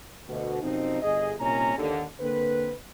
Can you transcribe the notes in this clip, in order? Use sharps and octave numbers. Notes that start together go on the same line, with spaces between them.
D2 B2
F#2 C3 F3 C4 D#4
G1 G#4 D#5
C2 A#2 D#3 C#4 A#5
D#2 D3
D3 A#3 C4 B4